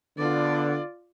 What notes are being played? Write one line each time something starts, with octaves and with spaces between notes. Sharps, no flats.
D3 B3 F4 D5